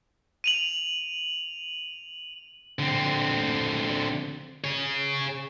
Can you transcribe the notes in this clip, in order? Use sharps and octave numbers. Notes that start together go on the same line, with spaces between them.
D#7 F7 F#7
D3 C4
G#4 C#5